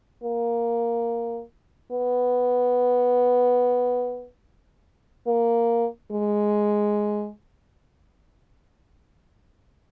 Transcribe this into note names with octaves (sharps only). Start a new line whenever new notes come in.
A#3
B3
A#3
G#3